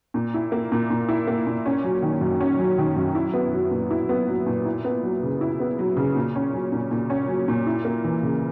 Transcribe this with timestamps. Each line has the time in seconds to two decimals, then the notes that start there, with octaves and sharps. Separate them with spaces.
0.14 A#2
0.34 E4
0.52 A#3
0.72 A#2
0.90 A#2
1.09 E4
1.27 A#3
1.47 A#2
1.66 C#4
1.84 F#3
2.02 D#3
2.21 F#2
2.41 C#4
2.59 F#3
2.78 D#3
2.96 F#2
3.15 E4
3.34 B3
3.53 F#3
3.71 A#2
3.91 E4
4.09 B3
4.28 F#3
4.46 A#2
4.65 E4
4.85 B3
5.03 F#3
5.23 C#3
5.41 E4
5.60 B3
5.79 F#3
5.97 C#3
6.16 A#2
6.35 C#4
6.53 F#3
6.72 A#2
6.91 A#2
7.10 C#4
7.28 F#3
7.48 A#2
7.67 E4
7.85 A#3
8.04 E3
8.23 C#3